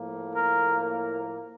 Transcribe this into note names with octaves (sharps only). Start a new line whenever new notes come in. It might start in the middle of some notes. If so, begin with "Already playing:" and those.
Already playing: A2 F3 A#3
A#4
A#4